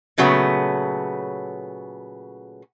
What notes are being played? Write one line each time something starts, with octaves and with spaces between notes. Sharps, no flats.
A#2 C#3 F#3 A3 B3